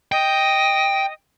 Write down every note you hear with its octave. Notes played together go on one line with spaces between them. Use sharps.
D#5 G5